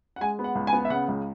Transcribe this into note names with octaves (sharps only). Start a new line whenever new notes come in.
F#5
G#3 G#5
B3
F#5
C#2
G#5
B3
E5
C#3 F#5
C#2